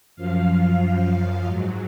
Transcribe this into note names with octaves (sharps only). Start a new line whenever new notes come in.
F#2 F3 F5
G#2 F#3